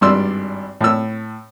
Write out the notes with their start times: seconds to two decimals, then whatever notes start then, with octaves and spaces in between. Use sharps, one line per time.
0.01 G#1 G2 D5 C6 E6
0.81 A2 E6